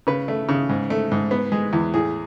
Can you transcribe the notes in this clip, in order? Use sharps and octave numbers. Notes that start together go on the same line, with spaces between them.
C#3 B4
A3
C#3
G#2
A3
G#2
B3
G#3
E2
A2 G#4